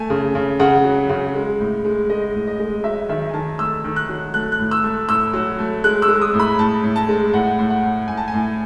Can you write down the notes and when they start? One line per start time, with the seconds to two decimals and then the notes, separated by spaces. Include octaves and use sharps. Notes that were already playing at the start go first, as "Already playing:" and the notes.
Already playing: A3 G#5
0.10 C#3
0.35 C#3
0.59 C#3 F#5
0.85 F#3
1.10 C#3
1.35 G#3
1.60 A2
1.84 G#3
2.10 G#3 D#5
2.34 A2
2.47 D#5
2.59 G#3
2.84 F#3 E5
3.09 D#3 E5
3.29 G#5
3.34 D#3 A5
3.59 A3 E6
3.84 D#3
3.96 F#6
4.09 F#3
4.34 A3 F#6
4.52 F#6
4.59 A2
4.71 E6
4.84 A3
5.08 A2 E6
5.34 F#3
5.59 A3
5.84 G#3 F#6
6.02 E6
6.08 G#3
6.21 D#6
6.34 A2
6.40 B5
6.59 A2 A5
6.83 A2
6.96 A5
7.09 G#3
7.33 A2 F#5
7.59 A2
7.70 F#5
7.83 A2
8.08 A2 G#5
8.17 A5
8.28 G#5
8.34 A2